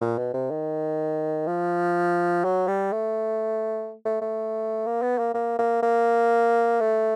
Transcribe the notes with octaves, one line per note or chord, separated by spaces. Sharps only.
A#2
B2
C3
D#3
F3
F#3
G3
A3
A3
A3
A#3
B3
A#3
A#3
A#3
A#3
A3